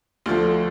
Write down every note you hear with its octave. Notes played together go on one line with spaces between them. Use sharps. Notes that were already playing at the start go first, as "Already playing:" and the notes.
D2 D3 F3 A3 F4